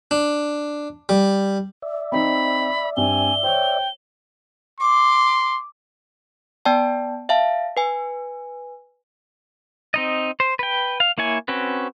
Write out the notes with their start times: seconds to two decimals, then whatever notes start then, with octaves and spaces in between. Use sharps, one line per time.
0.11 D4
1.09 G3
1.82 D5 E5
2.12 C4 D#4 B5
2.97 G2 C4 G#5 G7
3.43 C5 C#5 G5
4.81 C6 D6
6.65 B3 D5 G5 A5
7.29 E5 F5 A5
7.77 B4 G#5
9.94 C4 D#4 D#5
10.40 C5
10.59 B4 G5
11.00 F5
11.18 A#3 E4 C#5 G#5
11.48 C4 C#4 F#4 B4